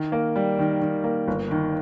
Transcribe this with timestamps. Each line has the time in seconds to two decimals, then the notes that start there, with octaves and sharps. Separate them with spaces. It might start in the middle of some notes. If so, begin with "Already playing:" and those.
Already playing: D#3
0.12 A#3
0.36 G3
0.59 D#3
0.82 D#3
1.04 A#3
1.28 G1
1.51 D#3